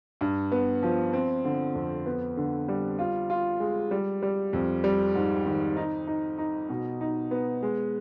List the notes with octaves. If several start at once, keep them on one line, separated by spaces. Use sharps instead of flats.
G2
B3
F3
C4
D3
F2
B3
D3
G3
F4
F4
G#3
G3
G3
F2
G3
G#2
D#3
D#4
D#4
D#4
B2
D#4
B3
G#3